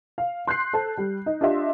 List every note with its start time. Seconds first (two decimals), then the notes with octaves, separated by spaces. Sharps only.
0.18 F5
0.47 C6 F#6 G6 C7
0.73 A4 C5 A5
0.98 G3
1.26 D#4
1.41 D4 F4 G4 D#5 E5 C6